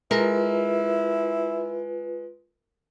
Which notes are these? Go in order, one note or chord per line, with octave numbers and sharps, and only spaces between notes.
G#3 E4 F4 A#4 B4